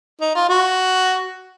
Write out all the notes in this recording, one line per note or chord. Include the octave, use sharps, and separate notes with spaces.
D#4
F4
F#4